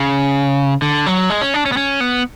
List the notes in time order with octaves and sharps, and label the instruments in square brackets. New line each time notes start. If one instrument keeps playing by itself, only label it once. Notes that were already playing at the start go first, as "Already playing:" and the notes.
Already playing: [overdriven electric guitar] C#3
D3
F#3
G#3
C#4
D4
C#4
B3
C#4
B3